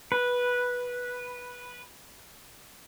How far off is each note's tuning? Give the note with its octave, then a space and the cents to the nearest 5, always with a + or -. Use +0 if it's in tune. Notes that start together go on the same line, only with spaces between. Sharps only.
B4 -10